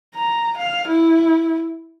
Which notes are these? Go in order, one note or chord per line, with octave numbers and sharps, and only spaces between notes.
A#5
F5
E4